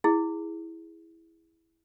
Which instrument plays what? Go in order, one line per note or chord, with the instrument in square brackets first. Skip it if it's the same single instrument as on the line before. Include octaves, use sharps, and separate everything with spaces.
[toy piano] E4 G#4